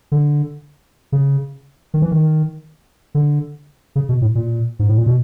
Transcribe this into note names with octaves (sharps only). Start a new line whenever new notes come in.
D3
C#3
D#3
E3
D#3
D3
C#3
B2
A2
A#2
G#2
A2
A#2
B2